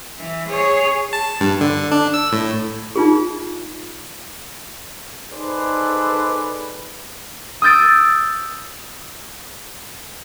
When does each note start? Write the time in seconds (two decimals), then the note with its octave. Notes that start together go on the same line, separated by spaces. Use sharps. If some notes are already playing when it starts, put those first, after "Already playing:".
0.18 E3
0.49 G#4 C#5
1.13 A5
1.41 G2
1.61 D3
1.92 D4
2.14 E6
2.32 A2
2.96 D#4 F4 G#4
5.32 D#4 G#4 A4 B4 C5 D5
7.62 D#6 E6 G6 A6 D7